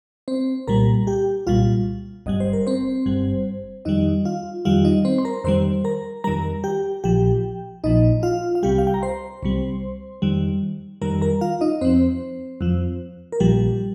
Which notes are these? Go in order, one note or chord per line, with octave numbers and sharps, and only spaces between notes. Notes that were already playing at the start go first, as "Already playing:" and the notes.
C4 C5
C2 A#2 G3 A#4 A#5
G4 G5
C2 A#2 G3 F4 F5
G1 G2 G3 D#5
C5
A#4
C4 C5
G1 G2 G3
F2 D#3 G3 D#4 D#5
F4 F5
F2 D#3 G3 F4 F5
D#4 D#5
C4 C5
C6
A#4 A#5
F2 D#3 G3 C5 C6
A#4 A#5
F2 D#3 G3 A#4 A#5
G4 G5
A#1 A#2 F3 G4 G5
A#1 A#2 F3 D#4 D#5
F4 F5
F5
C2 C3 G3 G4 G5
F5
G5
A#5
C5 C6
C2 C3 G3
F2 D#3 G3
F2 D#3 G3 A#4 A#5
A#4 A#5
F4 F5
D#4 D#5
F2 F3 C4 C5
F2 F3
A#4
A#1 A#2 F3 G3 G4